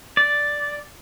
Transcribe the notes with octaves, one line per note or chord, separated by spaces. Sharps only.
D5